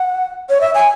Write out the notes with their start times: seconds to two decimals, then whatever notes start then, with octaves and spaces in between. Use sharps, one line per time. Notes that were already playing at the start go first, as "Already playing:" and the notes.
Already playing: F#5
0.49 C#5
0.61 E5
0.75 G#5